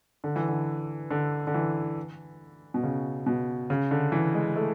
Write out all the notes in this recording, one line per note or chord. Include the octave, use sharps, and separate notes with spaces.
D3
E3
D3
D3
D3
E3
B2
C#3
B2
C#3
D3
E3
G#3
A3